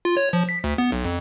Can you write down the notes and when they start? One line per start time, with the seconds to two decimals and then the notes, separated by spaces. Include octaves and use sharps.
0.05 F4
0.17 C#5
0.33 F3
0.49 B6
0.64 D2
0.78 B3
0.92 B1
1.04 F2